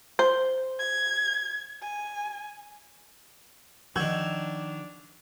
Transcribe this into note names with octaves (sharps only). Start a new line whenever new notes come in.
C5
G#6
G#5
D#3 F3 D4 F#4 E6 G6 G#6